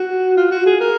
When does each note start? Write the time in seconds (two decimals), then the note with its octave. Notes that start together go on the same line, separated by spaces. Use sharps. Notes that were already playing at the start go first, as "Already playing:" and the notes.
Already playing: F#4
0.37 F4
0.51 F#4
0.66 G#4
0.80 A#4